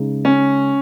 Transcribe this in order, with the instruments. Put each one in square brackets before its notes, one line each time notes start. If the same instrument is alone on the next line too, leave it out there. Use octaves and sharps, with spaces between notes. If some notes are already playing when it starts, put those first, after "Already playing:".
Already playing: [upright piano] C#3 G#3 D#4 G#4
[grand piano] C#4